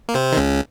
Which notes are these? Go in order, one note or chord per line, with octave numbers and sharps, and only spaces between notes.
A#3
C3 C4
D#3
C#2 C#3